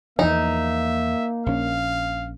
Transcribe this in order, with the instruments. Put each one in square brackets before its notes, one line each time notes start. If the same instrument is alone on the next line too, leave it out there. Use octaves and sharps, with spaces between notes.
[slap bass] E2 E3 F3 [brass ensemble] A#3 [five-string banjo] D#4 [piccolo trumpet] E5
[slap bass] A#1 C#4 [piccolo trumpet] F5